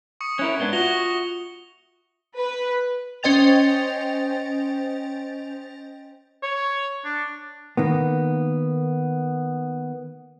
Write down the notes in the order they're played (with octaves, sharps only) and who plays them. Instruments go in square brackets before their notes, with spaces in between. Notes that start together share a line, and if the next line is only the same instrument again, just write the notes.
[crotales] C#6 D#6 C#7
[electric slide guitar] C#4 E4 A#4 [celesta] F#6
[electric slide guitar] G#2 B3 D4 [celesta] G#6 G7
[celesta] F4 E5 [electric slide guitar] F#4 [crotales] A#6 F7 G7
[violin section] B4
[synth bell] C#4 C5 D#5 G5 A6 F7
[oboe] C#5
D4
[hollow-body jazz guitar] D#3 A#3 B3